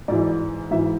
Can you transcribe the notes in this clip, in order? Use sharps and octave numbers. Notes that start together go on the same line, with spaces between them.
G#2 E3 D5
G#2 E3 E5